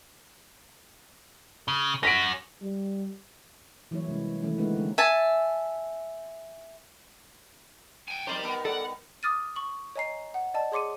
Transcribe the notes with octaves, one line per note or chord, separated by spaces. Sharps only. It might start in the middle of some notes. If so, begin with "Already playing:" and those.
C#3
C#4 F#4 A#6 B6 D7
G3
E3 F#3 G3 A#3 E4 C#5
C3 G#3 C4 C#4
D#3 E3 A3 C#4 E4
G#3 A#3 C4 D4 F#4 B4
D3 G#3 B3
E5 G#5 A5
G5 G#5
D#3 F#3 G3 C4 G4 A#4 C5 D5
B3 A#4 B4
A4 D5 F#5
D6 D#6 F6 A6 D#7
C#6 F#7
C#5 D#5 G#5 A#5 C7
F#5
D5 D#5 A5
G#4 C#5 C6 D6 C#7 D#7